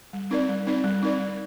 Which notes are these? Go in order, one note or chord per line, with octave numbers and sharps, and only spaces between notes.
G3
C4 D#4 A#4 D5
G3
C4 D#4 A#4 D5
G3
C4 D#4 A#4 D5
G3